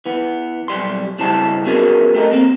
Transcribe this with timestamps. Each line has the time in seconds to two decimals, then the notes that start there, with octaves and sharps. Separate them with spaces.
0.06 E3 B3
0.68 B1 G3 C6
1.19 G2 C#3 E4 G4 C5 A5
1.66 B3 C#4 F#4 G#4 A#4 B4
2.14 A3 G4 A4 A#4 D#5
2.32 A#3 C4